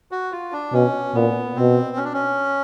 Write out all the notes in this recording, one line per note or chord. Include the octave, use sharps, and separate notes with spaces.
F#4
F4
D4
B2 C#4
A#2 B3
B2 C4
C#4
D4
C#4